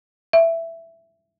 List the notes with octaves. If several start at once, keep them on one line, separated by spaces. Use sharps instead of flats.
E5